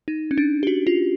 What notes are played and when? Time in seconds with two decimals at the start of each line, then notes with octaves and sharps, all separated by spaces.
0.08 D#4
0.31 C#4
0.38 D4
0.63 G4
0.67 F#4
0.87 F4